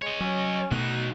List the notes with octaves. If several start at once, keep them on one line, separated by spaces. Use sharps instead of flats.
G#3 C#5 D#5
F#3 C#4
B2 F#3 A3 D#4 F#6